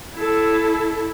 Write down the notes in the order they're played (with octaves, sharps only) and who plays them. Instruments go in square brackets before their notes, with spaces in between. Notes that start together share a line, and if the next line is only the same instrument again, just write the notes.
[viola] E4 A4